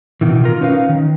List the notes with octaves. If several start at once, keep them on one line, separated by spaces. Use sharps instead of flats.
B2 D#3 E3
F4 A#4
C#4 D#4 B4 F5
D#3